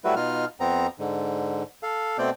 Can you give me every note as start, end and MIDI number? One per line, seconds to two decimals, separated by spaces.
0.05 0.15 54
0.05 0.15 55
0.05 0.15 57
0.05 0.15 64
0.05 0.15 66
0.05 0.15 71
0.16 0.45 47
0.16 0.45 63
0.16 0.45 65
0.16 0.45 89
0.60 0.87 41
0.60 0.87 59
0.60 0.87 60
0.60 0.87 82
0.99 1.63 44
0.99 1.63 50
1.83 2.17 69
1.83 2.17 77
2.18 2.30 47
2.18 2.30 57
2.18 2.30 60
2.18 2.30 74
2.18 2.30 79